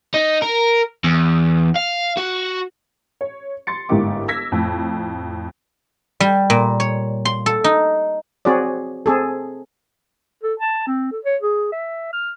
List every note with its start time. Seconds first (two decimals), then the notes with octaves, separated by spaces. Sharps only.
0.14 D#4
0.42 A#4
1.04 E2
1.76 F5
2.17 F#4
3.21 C#5
3.67 C6 A6 C#7
3.89 G1 G#2 A#3 E4 G4 D6
4.28 E6 G#6 A#6 B6
4.52 F2 A2
6.20 G3
6.50 A#2
6.80 C#5
7.25 C6
7.46 A4
7.64 D#4
8.45 C4 F#4 G#4 C#5 D5
9.06 C4 G#4 A4
10.44 A4
10.60 A5
10.87 C4
11.12 A4
11.24 C#5
11.42 G#4
11.72 E5
12.13 F6